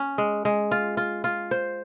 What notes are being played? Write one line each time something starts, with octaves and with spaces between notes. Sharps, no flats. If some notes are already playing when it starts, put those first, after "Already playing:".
Already playing: C#4
G#3
G#3
F4
F4
F4
C5